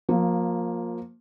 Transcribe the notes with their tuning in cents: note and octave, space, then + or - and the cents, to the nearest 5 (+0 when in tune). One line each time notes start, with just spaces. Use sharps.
F3 +25 A#3 +0